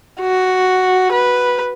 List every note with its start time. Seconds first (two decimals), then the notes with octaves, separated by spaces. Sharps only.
0.21 F#4
1.13 B4